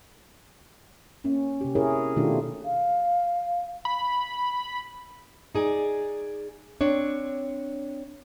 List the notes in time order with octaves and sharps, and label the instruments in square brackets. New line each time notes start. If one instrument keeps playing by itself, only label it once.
[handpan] A#3 C#4
C3 G4
E4 G#4 A#4 C#5
B2 D#3 A3 D4 F4 G4
[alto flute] F5
[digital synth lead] B5
[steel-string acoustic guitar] D#4 G#4 D5 G#5
C4 D4 C#5